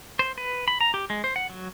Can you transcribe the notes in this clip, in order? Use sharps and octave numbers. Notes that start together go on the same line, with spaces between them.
C5
B4
B5
A#5
G4
G#3
C5
F#5
F#3